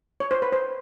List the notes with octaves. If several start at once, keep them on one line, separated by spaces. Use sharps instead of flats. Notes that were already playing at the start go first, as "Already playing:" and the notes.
C#5
C5
B4
C5